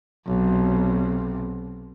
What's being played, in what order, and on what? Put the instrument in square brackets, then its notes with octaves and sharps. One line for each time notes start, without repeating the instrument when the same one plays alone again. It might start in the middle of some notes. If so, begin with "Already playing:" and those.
[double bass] B1 C3